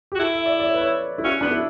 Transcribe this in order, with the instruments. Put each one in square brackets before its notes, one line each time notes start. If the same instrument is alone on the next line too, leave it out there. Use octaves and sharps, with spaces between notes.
[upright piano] G4
[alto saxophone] F#4
[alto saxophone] E4 [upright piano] A4
[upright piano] E5
D5
D5
C#5
B4
C#5
E4
[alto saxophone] C#4 [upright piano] F#4
[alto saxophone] B3 [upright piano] D4
[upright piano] E4